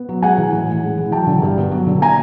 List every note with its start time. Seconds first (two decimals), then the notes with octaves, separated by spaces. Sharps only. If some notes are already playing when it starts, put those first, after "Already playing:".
Already playing: B3
0.09 F#3
0.22 G#3 F#5 G#5
0.38 E3
0.53 A2
0.68 A2
0.83 G#3
0.98 E3
1.12 F#3 G5 A5
1.27 D3
1.42 G2
1.58 B3
1.72 F#3
1.87 D3
2.02 A#3 G#5 A#5